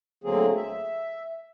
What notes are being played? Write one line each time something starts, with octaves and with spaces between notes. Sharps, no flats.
D2 D3 F#3 A#3 C4 G#4
E5